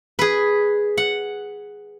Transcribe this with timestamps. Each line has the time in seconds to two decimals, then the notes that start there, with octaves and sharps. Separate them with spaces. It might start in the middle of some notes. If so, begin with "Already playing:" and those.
0.19 G#4 B4
0.97 F#5